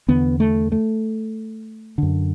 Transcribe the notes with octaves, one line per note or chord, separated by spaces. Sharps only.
E2 D3 B3
A3
A3
F#2 D3